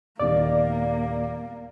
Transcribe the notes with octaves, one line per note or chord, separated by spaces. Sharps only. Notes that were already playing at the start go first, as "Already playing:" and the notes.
D#1 D#3 A#3 D5